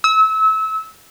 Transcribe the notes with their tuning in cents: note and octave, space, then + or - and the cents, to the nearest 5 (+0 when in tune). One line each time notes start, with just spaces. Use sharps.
E6 -30